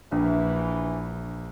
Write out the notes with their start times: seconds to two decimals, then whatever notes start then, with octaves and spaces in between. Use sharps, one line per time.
0.12 A#1 E3 D4